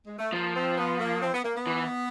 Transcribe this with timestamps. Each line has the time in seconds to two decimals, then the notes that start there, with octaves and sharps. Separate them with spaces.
0.06 G#3
0.19 A3
0.33 F3 A#3
0.55 C4
0.77 B3
1.00 A#3
1.22 C4
1.33 B3
1.44 A#3
1.56 B3
1.67 E3